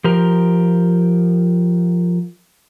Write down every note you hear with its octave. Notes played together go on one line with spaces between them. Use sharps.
F3 G4 A#4